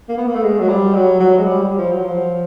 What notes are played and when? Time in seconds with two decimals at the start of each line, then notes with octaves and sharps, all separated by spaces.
0.09 A#3
0.18 B3
0.27 A#3
0.35 A3
0.45 G#3
0.60 F#3
0.69 G3
0.95 F#3
1.20 F#3
1.39 G#3
1.46 G3
1.63 G3
1.79 F3
1.93 F#3
2.05 F3